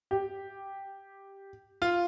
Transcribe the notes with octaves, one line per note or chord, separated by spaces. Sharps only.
G4
F4